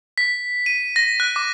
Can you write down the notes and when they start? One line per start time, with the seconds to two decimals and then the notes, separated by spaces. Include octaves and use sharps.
0.18 B6
0.66 D#7
0.96 A#6
1.20 F#6
1.36 D6